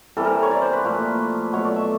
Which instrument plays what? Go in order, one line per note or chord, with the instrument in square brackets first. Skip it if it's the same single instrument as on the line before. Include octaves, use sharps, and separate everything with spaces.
[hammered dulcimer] C3 E3 G3 A4
A#4
C#5
D5
C5
B4
A#2 F3 A3
B2 F#3 A3 C#5
D5
E5